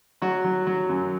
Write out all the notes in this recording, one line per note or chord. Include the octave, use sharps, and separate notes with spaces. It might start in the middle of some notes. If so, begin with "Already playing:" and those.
F#3 F#4
F#3
F#3
F#2